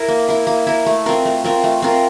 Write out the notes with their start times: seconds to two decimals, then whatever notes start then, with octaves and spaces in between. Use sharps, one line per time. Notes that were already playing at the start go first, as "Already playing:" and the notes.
Already playing: E4 A#4
0.08 A#3
0.29 E4 A#4
0.47 A#3
0.67 E4 A#4
0.86 A3
1.06 C4 F4 A#4
1.25 A3
1.44 C4 F4 A#4
1.64 A3
1.82 C4 F4 A#4